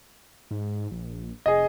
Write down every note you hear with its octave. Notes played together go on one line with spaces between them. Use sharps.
G#2
A#1
F1 G#4 D#5